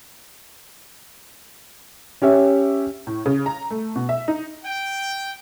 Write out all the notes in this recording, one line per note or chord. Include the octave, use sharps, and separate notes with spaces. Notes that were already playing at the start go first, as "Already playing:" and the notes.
C#4 G4 C#5 E5
A2
C#3
A#5
A3
B2
E5
D#4
G5